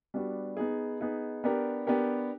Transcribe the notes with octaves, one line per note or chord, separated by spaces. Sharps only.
G3 B3 D4 F#4
B3 D#4 G#4
B3 D#4 G#4
B3 D4 G4 A#4
B3 D4 G4 A#4